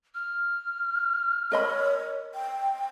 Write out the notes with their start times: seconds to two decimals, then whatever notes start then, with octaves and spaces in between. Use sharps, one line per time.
0.15 F6
1.52 A#4 C#5 D#5 B5
2.34 G5